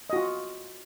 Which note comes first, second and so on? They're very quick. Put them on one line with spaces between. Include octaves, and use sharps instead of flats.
D#5 F#4 F4